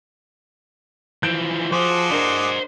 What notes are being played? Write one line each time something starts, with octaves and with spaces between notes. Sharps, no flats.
E3 F3 G6 D7 E7
F3 F#4 G#4 C5 D6
D4 A#4 C5 D#5